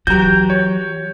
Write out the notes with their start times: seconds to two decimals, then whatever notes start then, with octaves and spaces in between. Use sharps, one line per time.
0.07 E3 F#3 F#4 G4 A#5 G6
0.50 C#5